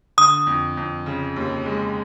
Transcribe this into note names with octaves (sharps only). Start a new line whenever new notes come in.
D3 D#6
F2
F2
C#3
D#2
G#3